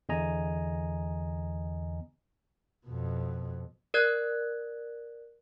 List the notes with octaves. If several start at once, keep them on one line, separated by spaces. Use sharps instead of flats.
E2 D3 D#5 G#5 A#5
F2 B2
A#4 D5 F#6 G#6